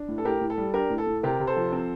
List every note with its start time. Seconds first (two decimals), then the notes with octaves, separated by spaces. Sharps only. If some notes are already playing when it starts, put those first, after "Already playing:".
Already playing: D4
0.08 A2
0.18 A4
0.25 A2 G4 A#4
0.41 A2
0.50 A4
0.57 G3
0.74 D4 G4 A#4
0.90 A2
0.98 A4
1.07 A2
1.23 C3 G4 A#4
1.40 C3
1.47 A4 C5
1.56 F3
1.72 C4